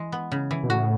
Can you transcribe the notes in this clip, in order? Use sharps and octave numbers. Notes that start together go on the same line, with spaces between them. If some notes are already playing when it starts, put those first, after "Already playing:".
Already playing: E3 G#3
B3
C#3
E3
B2
A2 F#4